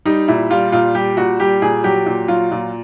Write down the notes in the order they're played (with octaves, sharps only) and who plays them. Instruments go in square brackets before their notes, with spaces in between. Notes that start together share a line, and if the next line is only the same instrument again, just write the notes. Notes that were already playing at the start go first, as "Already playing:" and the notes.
[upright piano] G3 D#4
A#2 E4
G3 F4
A#2 F4
G3 G4
A#2 F#4
G3 G4
A#2 G#4
F#3 G4
A#2
F#3 F4
A#2